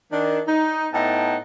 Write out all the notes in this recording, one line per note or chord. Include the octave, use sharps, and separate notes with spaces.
D#3 D4
D#4
A2 B3 D#4 F#5 G5 A5